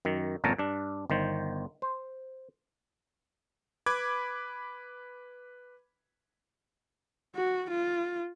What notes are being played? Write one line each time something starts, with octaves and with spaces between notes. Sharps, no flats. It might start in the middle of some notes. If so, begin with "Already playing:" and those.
F#2 D#3
G#1 F2 A#2 C#4 A5 A#5
G2 D4
G1 D#3 C5
C5
B4 B5 D6 G#6
F#4
F4